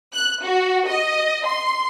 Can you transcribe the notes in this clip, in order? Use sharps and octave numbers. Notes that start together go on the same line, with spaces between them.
F#6
F#4
D#5
C6